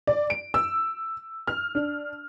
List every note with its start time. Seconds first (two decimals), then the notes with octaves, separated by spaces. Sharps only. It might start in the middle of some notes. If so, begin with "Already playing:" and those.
0.07 D5
0.30 D7
0.54 E6
1.47 F6
1.75 D4